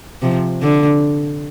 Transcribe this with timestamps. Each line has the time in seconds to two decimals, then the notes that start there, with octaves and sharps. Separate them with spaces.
0.22 C3 F3
0.61 D3